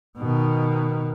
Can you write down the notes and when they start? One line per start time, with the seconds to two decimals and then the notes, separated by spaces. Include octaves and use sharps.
0.17 B2 D#3